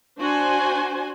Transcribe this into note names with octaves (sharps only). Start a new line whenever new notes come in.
D4 F#4 C5 G#5